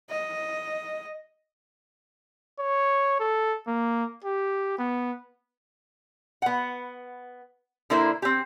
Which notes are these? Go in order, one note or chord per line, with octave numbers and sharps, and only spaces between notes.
D#5
C#5
A4
A#3
G4
B3
B3 F#5
D3 A#3 E4 A#4 C5
C4 G4